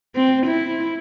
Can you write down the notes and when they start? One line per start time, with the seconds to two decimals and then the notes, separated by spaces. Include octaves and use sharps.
0.16 C4
0.47 E4